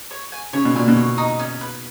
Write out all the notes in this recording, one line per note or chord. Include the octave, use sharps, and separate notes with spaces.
C#5
G#5
C#3 C#5
B2
A#2 G#5
B2
C#5
D#4
C#4
B4